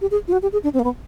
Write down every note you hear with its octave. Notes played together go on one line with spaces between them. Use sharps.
G4
G#4
F4
F#4
G4
G#4
D4
C4
A#3
B3